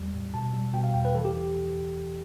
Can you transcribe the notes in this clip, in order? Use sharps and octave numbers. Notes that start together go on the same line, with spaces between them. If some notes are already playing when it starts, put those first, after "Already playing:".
Already playing: E2 G3
A2
B2 A5
G3
B2 G5
F5
E2 G5
B4
E3 A4
G4